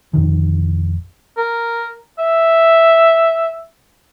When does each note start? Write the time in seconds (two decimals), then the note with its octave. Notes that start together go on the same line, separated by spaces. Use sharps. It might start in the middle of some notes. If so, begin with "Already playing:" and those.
0.13 A#1 F2 D#3
1.37 A#4
2.19 E5